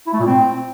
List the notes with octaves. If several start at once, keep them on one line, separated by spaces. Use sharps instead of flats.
E4
A3
A#2
C4